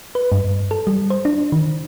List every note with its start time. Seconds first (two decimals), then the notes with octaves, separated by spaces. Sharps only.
0.15 B4
0.32 G2
0.71 A4
0.87 G3
1.10 C5
1.25 D4
1.52 D#3